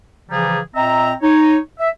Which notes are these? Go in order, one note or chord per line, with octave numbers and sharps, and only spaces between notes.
C#3 E3 F3 G3 G#4 A#5
A#2 C4 D#5 E5 A#5
D#4 C#5
E5